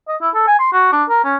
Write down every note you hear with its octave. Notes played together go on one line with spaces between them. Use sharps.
D#5
E4
A4
G#5
C6
F#4
D4
A#4
C#4